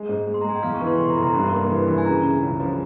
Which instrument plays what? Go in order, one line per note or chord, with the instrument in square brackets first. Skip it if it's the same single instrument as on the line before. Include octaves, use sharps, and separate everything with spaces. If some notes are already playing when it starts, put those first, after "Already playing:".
Already playing: [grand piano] G#3
G#2
G#3
[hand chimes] C6
A#5
[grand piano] G#3 [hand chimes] G#5
[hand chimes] G5
[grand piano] E2 [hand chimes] F5
[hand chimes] C#6
[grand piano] E3
[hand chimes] C6
[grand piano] F1 [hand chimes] C6
[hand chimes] A#5
[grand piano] F1
[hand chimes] A#5
[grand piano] G2 [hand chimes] C6
[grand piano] A#3
E3
E3
[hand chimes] G#5
[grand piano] C#3 [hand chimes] A#5
[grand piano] C#3
C#2
F3